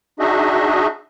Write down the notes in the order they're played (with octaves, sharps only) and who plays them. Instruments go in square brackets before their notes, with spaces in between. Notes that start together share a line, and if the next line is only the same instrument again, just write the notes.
[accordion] D4 D#4 F#4 G#4 D#5 E5